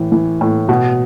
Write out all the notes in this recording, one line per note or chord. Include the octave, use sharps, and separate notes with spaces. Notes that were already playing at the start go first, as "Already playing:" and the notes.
Already playing: A2 E3
E3
A2
B2